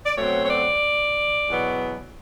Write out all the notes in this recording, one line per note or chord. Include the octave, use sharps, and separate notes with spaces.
D5
B2 F#3 A3 C4 C#5
C#5
D5
E2 B2 F#3 B3